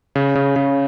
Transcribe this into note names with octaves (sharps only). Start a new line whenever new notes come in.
C#3
C#3
C#3